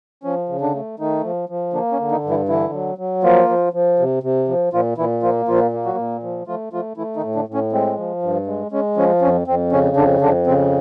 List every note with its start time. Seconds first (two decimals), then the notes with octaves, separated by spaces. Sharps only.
0.24 F3 C#4
0.49 C#3
0.61 D3 D4
0.75 A3
0.99 D#3 A3 D#4
1.23 F3
1.49 F3
1.73 D3 A#3 D4
1.92 C#4
1.99 D3
2.12 D#3 D#4
2.24 G2
2.29 E3 E4
2.48 D3 E3 E4
2.73 F#3
2.98 F#3
3.23 F3 A#3 F4
3.49 F3
3.73 F3
3.99 C3
4.23 C3
4.48 F3
4.73 A#2 F3 F4
4.97 A#2 E3 E4
5.23 F3 A#3 F4
5.48 A#2 F3 F4
5.73 A#3
5.85 F#3 F#4
5.98 A#2
6.23 F3
6.47 F3 A3 F4
6.73 F3 A3 F4
6.97 E3 A3 E4
7.16 D#3 D#4
7.23 A2
7.35 D3 D4
7.48 A2
7.54 C#4
7.72 G#3 C4
7.98 F3
8.22 G2
8.47 G#3
8.72 G#3 C#4
8.97 F3 C#4
9.22 F2 C#4
9.48 F2 C4
9.72 C#3 C#4
9.96 F2 D3 D4
10.21 F2 D3 D4
10.47 C#3 C4